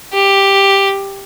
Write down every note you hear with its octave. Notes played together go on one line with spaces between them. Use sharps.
G4